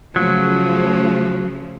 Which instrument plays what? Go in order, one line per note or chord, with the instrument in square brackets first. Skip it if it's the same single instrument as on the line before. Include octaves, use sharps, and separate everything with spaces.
[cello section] C#3 F3 A3 [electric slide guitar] F#3